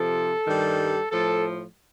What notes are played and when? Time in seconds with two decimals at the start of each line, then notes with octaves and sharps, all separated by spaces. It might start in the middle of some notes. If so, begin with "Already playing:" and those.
Already playing: C3 F3 A4
0.46 G2 D#3 G3
1.11 A2 F3 A4